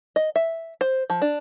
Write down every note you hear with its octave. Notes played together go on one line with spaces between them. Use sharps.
D#5
E5
C5
F3
D4